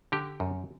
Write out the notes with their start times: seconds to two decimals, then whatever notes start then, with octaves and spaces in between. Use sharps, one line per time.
0.12 D3 G4
0.40 F#2